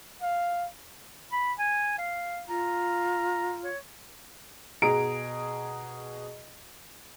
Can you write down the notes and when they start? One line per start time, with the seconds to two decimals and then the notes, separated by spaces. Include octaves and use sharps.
0.22 F5
1.32 B5
1.59 G#5
1.98 F5
2.49 F4 A#5
3.64 C#5
4.82 B2 G#4 A#5 D7